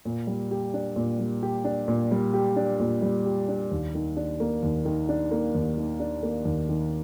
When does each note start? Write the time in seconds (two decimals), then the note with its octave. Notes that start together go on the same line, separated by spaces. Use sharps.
0.05 A#2
0.27 G3
0.51 G4
0.74 D4
0.96 A#2
1.19 G3
1.43 G4
1.64 D4
1.88 A#2
2.11 G3
2.34 G4
2.56 D4
2.80 A#2
3.02 G3
3.26 G4
3.48 D4
3.71 D#2
3.95 D#3
4.17 D4
4.40 A#3
4.63 D#2
4.85 D#3
5.09 D4
5.31 A#3
5.55 D#2
5.78 D#3
6.00 D4
6.23 A#3
6.45 D#2
6.69 D#3